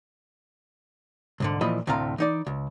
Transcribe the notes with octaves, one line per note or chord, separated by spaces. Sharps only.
C2 G#2 D3
A#2 E3 F3 D#5 B5
D2 A2 C3 C4 F5 A#5
E3 D#4 D5
C#2